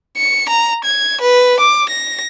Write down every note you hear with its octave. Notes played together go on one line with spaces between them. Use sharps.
C#7
A#5
G#6
B4
D6
A#6